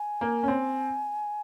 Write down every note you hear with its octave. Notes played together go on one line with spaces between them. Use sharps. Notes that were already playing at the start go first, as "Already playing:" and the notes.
Already playing: G#5
A#3
C#4
C4